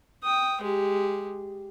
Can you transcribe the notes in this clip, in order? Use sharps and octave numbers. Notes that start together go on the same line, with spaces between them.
G5 D#6
G#3 G4